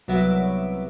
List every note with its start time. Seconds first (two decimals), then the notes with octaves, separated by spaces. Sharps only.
0.08 C2 F#3 B3 F#4 E5 D6